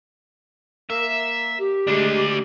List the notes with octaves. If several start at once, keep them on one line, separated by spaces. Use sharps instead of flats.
A#3 E5
G4
D2 G#3 D4